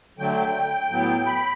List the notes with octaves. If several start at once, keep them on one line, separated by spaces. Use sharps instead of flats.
D3 F#3 A3 G5
A2 F#3 B3
B5